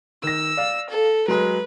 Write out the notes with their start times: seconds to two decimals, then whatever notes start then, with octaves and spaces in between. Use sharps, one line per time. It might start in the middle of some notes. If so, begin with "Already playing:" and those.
0.23 D#3 E6 A#6
0.57 D5 F5
0.90 A4
1.28 F#3 G#3 B4